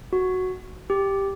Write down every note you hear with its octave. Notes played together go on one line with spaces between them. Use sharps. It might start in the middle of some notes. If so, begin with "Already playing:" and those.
F#4
G4